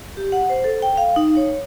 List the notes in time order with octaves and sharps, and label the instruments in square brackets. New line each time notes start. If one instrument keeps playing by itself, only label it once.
[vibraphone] G4
F#5
C5
A4
G5
F5
D#4
C#5